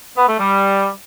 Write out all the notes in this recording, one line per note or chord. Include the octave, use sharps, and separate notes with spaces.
B3
A3
G3